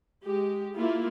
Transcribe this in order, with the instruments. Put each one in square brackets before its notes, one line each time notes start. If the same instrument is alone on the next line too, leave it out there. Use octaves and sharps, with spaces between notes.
[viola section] G#3 G4
A#3 E4 F4